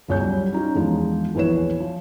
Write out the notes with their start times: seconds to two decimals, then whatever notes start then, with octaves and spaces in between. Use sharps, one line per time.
0.08 G1 C#2 C#5 G6
0.20 F#3 G3
0.52 C#4 D#4 F4
0.75 E2 F3 G#3 D4 D#4
1.35 A#1 E2 E4 B4 C#5 E7
1.80 F3